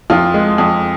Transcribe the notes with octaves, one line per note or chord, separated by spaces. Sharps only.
F2 F4
G#3
F2